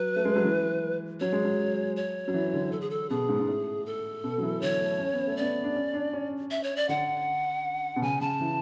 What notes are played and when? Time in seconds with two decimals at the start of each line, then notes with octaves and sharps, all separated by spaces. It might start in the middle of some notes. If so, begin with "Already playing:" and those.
Already playing: F#3 B4
0.16 A3
0.25 G#3
0.35 F#3
0.44 E3
1.20 F#3 C#5
1.32 G#3
1.44 F#3
1.96 C#5
2.28 F#3
2.34 E3
2.53 D3
2.72 A4
2.81 G#4
2.90 A4
3.10 B2 G#4
3.29 G#2
3.40 G#2
3.48 A2
3.86 A4
4.24 B2
4.38 F#3
4.42 E3
4.61 D3 C#5
4.80 A3
4.99 C#4
5.14 B3
5.27 A3
5.37 B3 D5
5.64 D4
5.75 C#4
5.94 D4
6.13 C#4
6.51 E5
6.63 C#5
6.77 D5
6.89 D3 F#5
7.96 B2
8.02 C#3 G#5
8.21 C#3 A5
8.41 E3